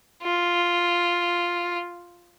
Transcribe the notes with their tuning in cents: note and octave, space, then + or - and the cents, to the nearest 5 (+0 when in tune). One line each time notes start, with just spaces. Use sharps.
F4 +0